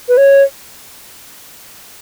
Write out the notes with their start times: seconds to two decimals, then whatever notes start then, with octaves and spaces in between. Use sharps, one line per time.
0.09 B4
0.17 C#5